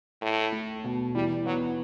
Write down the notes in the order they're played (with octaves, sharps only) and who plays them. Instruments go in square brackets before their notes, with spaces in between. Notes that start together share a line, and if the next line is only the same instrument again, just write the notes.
[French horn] A2 [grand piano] A4
[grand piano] A3
B2
[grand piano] E3 [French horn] G3
[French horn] F#3 [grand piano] B3